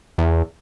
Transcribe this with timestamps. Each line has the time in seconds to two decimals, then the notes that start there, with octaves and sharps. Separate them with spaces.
0.18 E2